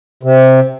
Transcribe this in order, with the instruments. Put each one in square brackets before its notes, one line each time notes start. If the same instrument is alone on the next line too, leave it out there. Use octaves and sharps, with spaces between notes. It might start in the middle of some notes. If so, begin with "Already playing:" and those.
[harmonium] C3